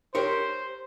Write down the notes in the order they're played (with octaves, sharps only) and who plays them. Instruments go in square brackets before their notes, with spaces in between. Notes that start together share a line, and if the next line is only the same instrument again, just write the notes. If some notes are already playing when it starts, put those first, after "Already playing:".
[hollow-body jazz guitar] G4 A#4 C#5 [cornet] C5